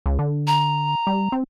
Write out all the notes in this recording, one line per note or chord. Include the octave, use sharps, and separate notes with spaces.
C#2
D3
A#5
G3
C4